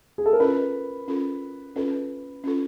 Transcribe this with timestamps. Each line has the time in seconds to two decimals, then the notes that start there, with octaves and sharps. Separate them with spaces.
0.18 G#4
0.26 A4
0.33 A#4
0.40 C#4 F4 A4 B4
1.08 C#4 F4 A4
1.76 C#4 F4 A4 B4
2.44 C#4 F4 A4